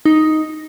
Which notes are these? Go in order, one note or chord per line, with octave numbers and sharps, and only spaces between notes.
D#4